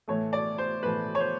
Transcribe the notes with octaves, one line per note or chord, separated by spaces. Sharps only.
A2 E3 A3 C#5
D5
C5
A2 E3 A3 B4
C#5
C5